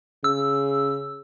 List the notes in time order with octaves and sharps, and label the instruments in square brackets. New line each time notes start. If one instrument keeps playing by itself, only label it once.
[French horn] C#3 [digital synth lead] E6